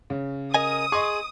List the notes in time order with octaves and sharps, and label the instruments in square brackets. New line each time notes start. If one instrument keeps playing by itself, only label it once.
[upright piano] C#3
[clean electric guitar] A#4 D#5 G#5 [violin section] D#6
[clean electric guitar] G#4 [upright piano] D#5 C6 C#6